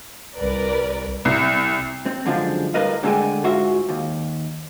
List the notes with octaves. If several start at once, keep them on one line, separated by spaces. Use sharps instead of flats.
C2 A#4 B4 D5
C2
C4
F#2 D3 F3 G#3 D4
A2 G3 A#4 B4 D#5 F5
D3 G#3 A3 F5 G5 G#5
G#2 F4 F#4 C5 E5
D#2